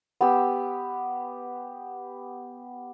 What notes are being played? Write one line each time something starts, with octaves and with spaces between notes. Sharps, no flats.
B3 G4 E6